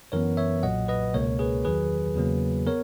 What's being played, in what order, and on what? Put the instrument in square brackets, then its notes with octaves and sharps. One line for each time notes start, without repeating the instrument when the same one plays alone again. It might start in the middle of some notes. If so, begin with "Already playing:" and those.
[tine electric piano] F#2 E3 B3 A#4 C#5
C#5 E5
B1 A#2 F#3 D#5 F#5
B4 D#5
C#2 B2 A#3 A#4 C#5
G#4 B4
E2 D#3 F#3 G#4 B4
E2 C#3 F#3 A#3
B3 A#4 C#5